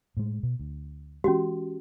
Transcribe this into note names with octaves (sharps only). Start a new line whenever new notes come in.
A2 G#3
B2
D2
E3 G#3 C#4 F#4 G4